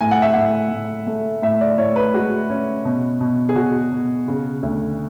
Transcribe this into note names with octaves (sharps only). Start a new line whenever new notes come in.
A2 G#5
F#5
E5
A2 F#5
A2
A3
A2 E5
D5
A2 C#5
B4
G#3 F#4
C#4
B2
B2
G#4
B2 F#4
B2
C#3
D2